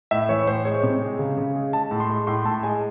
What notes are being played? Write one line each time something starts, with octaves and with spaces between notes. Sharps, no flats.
A2 E5
E3 C#5
A2 C5
G#3 C#5
C3
G#3
C#3
C#3
G#3
G#3 A5
A2
C6
G#3
A2 C6
A2 A5
G#3 G#5